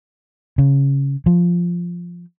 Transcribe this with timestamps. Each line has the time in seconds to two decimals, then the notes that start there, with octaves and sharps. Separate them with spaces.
0.58 C#3
1.26 F3